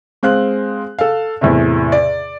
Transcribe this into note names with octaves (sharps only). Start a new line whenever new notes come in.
G#3 C4 F5 F#6
A4 F5
E2 A2 C3
D5